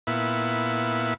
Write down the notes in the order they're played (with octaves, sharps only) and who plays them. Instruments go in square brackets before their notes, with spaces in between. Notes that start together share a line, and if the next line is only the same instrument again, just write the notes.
[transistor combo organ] A#2 B3 E4